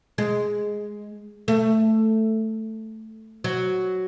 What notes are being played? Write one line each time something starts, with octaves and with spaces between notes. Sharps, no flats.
G#3
A3
F#3